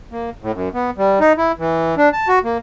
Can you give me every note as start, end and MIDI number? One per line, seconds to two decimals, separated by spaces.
0.12 0.30 58
0.42 0.52 45
0.54 0.69 42
0.74 0.90 59
0.98 1.19 55
1.20 1.33 63
1.38 1.52 64
1.59 1.95 52
1.97 2.09 62
2.13 2.28 81
2.28 2.39 66
2.44 2.58 58